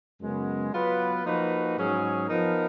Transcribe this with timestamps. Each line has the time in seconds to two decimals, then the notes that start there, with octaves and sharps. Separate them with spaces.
0.19 F#2 C#3 G#3 B3
0.71 F#3 B3 F4 B4
1.23 F3 A#3 D#4 F#4 B4
1.75 G#2 F#3 C#4 G#4
2.28 F3 B3 D#4 A#4